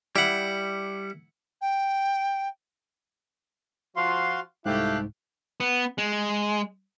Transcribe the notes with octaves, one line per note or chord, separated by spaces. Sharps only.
G3 E4 F#5
G5
F3 F4 F#4 F5 C6
C2 G#2 A3 E4 G4 F5 F#6
B3
G#3